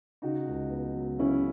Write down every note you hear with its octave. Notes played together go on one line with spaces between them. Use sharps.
C#3 D#4 F#4
C#2
B3
F#3
C#3 C#4 E4